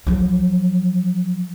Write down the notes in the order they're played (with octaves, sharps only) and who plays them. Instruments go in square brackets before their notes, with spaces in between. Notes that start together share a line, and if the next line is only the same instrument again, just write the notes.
[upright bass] F3 F#3